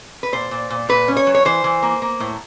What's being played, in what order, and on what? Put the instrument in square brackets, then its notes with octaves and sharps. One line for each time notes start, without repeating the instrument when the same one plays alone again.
[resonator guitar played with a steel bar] B4
A#2 C5
A#2
A#2
A#2 B4
C#4
C#5
F#3
C#5
E3 C5
E3
A#3
A#3
A2